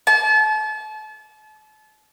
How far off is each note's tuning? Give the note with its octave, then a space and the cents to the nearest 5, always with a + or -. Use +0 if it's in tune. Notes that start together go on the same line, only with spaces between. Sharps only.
A5 -35